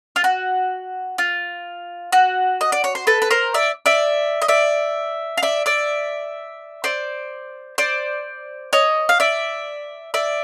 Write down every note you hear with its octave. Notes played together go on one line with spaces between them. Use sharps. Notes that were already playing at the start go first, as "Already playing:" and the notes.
F4
F#4
F4
F#4
D#5
D5
C#5
C5
A4 B4
B4
A#4 C5
D5 E5
D5 E5
D#5
D5 E5
F5
D5 E5
D5 E5
C5 D5
C5 D5
C#5 D#5
F5
D5 E5
D5 E5